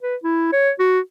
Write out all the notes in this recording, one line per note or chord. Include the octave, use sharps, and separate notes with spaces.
B4
E4
C#5
F#4